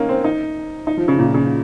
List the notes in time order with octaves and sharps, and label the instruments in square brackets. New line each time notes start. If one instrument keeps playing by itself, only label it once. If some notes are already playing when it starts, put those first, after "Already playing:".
Already playing: [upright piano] A#3 C#4 D#4
C4
D#4
D#4
F3
C#3
A#2
C#3